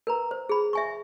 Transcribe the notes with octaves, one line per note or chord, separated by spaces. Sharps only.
A#4 B4 A#5
C5
G#4 B5
E5 G#5 C#6